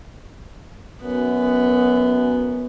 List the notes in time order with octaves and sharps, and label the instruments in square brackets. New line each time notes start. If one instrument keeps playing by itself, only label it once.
[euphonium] F#2 [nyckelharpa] B3